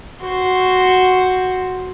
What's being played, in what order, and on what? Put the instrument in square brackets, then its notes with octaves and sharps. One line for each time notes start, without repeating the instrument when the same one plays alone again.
[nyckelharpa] F#4 C5